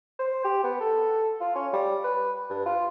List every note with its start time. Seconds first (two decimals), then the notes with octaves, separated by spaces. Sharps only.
0.19 C5
0.44 G4
0.64 B3
0.80 A4
1.41 F4
1.55 C#4
1.73 G3
2.04 B4
2.50 G2
2.66 F4